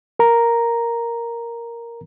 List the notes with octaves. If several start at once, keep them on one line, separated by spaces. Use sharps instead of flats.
A#4 A#5